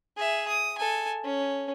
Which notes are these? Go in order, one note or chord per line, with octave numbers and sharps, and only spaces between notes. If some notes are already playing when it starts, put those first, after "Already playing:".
G#4 E5
D#6
A4 G#5
C#4